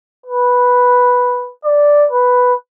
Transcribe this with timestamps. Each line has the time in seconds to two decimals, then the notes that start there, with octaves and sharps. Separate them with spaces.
0.26 B4
1.65 D5
2.12 B4